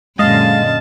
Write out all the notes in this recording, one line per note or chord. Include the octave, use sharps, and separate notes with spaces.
F#2 A#2 D3 G#3 D#5 F5 A5